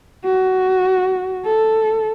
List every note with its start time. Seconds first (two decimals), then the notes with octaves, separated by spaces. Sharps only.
0.24 F#4
1.45 A4